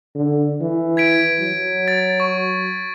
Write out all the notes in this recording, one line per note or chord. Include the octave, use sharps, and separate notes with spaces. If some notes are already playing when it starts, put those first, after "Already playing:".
D3
E3
G#6 B6 D7
F#3
A6
C#6